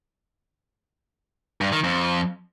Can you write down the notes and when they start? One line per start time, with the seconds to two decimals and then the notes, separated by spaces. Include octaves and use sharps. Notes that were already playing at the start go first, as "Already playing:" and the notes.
1.61 G2
1.72 D#3
1.84 F2